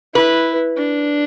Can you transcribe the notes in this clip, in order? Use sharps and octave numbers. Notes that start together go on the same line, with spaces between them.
E4 B4
D4